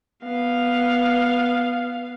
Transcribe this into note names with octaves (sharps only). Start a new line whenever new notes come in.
B3 F5